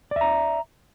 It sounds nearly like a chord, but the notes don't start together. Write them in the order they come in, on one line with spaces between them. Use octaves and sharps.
D5 E5 A#5